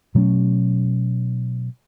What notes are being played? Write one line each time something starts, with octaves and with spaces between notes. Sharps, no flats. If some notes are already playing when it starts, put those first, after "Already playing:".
B2 F#3 A3 C#4